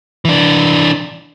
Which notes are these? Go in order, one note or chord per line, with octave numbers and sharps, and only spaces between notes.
E3 D4